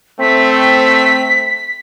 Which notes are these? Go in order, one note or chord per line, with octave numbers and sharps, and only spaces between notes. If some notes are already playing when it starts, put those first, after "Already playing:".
A3 C4 B6